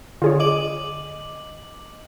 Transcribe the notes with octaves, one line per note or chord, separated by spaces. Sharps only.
D3 F4 G#4 C#5
D#5 D6 F#7